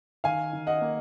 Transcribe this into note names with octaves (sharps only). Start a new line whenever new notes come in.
D#3 F5 G#5
D#3
D#5 F#5
A#3